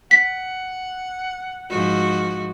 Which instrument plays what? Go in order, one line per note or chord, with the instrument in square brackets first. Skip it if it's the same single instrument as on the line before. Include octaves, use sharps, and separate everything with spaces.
[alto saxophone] F#5 [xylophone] B6
[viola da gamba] G#2 F3 F#4